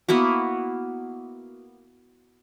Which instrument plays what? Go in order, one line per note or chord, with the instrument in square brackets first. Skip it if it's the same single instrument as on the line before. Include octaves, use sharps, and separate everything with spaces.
[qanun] A#3 B3 E4 F#4